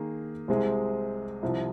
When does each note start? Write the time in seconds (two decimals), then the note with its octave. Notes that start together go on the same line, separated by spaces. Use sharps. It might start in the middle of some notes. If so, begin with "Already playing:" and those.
Already playing: D#3 A#3 G#4
0.48 C2 C3 G#3 C4 G#4
1.43 C2 C3 F3